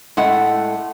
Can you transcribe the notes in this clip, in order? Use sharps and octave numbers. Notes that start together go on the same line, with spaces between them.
A2 G#3 A3 F#5